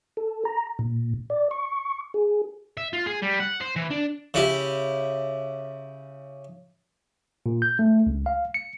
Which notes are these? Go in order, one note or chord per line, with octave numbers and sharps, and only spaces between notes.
A4
A#5
A#2
D5
C#6
G#4
E5
F4
G#4
G3
F#5
C5
E3
D4
C#3 E4 G4
A#2
G6
A3
C#2
F5
C#7